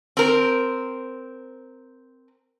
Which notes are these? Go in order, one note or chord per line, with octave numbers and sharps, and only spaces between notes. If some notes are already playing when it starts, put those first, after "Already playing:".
C4 A#4